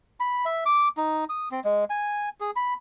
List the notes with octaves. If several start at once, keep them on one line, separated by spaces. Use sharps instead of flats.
B5
E5
D6
D#4
D#6
C4
G#3
G#5
G#4
B5